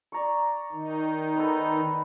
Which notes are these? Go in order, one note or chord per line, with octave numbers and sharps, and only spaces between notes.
D5 A#5 C#6
D#3 D#4
B3 A4 B4 A#5 B5